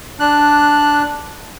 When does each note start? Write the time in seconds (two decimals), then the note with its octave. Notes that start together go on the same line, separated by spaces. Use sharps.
0.20 D4 F#6